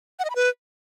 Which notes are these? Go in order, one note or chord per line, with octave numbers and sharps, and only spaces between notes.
F#5
D#5
B5
B4